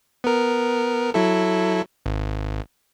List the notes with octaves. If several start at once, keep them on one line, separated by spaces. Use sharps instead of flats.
B3 A#4
F#3 E4 A4
G#1